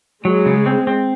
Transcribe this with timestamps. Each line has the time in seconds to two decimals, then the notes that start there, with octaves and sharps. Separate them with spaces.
0.25 F#3 G#3
0.46 C#3
0.66 C4
0.87 C4